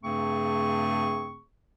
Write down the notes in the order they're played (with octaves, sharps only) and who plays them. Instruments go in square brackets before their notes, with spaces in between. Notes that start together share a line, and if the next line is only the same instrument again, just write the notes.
[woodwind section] G2 C#3 A3 C4 G#4 C#6